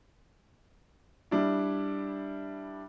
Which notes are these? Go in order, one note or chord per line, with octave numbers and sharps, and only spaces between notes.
G3 D4 E4